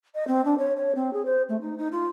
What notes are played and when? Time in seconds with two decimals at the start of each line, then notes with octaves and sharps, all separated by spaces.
0.15 D#5
0.27 C4
0.45 D4
0.58 C#5
0.76 C#5
0.95 C4
1.13 G#4
1.25 C5
1.49 A3
1.61 D#4
1.78 D#4
1.91 F4